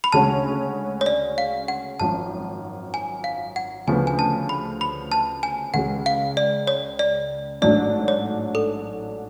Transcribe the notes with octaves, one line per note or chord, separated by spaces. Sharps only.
B5
D2 C#3 G#3 C#4 F#4 A5
C#5
D5
F5
F#5
G#1 F#2 F3 A5
G#5
F5
F#5
D2 C#3 F3 B3 G#5
G#5
A5
B5
B5
A5
G#5
C#2 C#3 G#3 F#5
F5
D5
C#5
D5
A1 G#2 F#3 A3 D4 D5
C#5
A4